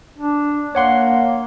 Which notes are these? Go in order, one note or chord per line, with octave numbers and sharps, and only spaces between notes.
D4
A#3 C#5 F#5 C6